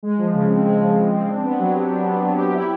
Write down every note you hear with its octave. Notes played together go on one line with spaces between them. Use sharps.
G#3
F3
C#3
C4
G#3
F3
C#3
C4
D4
B3
F#3
G4
D4
B3
F#3
G4
E4